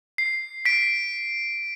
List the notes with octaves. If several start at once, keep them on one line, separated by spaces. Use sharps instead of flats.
C7
B6 D7